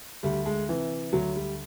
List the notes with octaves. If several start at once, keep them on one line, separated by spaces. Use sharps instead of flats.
D2 G3
G#3
C3 E3
D2 F#3
G3